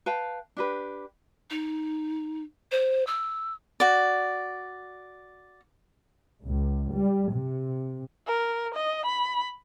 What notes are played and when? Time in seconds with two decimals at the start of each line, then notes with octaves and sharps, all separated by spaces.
0.06 B4 F5 G5 A5
0.57 D4 G4 B4
1.50 D#4
2.72 C5
3.07 E6
3.80 F#4 D5
6.45 C#2
6.91 G3
7.32 C3
8.27 A#4
8.75 D#5
9.06 B5